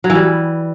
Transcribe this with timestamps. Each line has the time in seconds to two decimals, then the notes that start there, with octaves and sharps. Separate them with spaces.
0.04 F#3
0.10 E3
0.15 G3